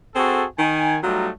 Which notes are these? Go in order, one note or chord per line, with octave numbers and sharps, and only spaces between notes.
C4 F#4 G#4 A4
D#3 G#5
F#3 G3 A3 D#4 F4